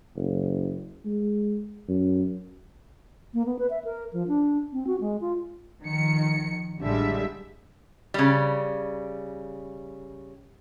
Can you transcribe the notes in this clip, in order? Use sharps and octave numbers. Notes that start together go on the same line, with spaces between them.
F#1
G#3
F#2
A#3
B3
B4
E5
A#4
F3
D4
C4
F#4
G#3
F4
D#3 F3 C#7
A1 D3 G3 G#3 E5
C#3 G3